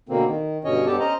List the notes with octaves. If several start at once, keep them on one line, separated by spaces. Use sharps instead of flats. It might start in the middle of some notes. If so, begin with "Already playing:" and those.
B2 D3 A#3 C4
D#3
G2 B2 D3 C#4 C#5 D#5
G2 B3 G4 A4 D5 A5
C#4 C5 D#5 A#5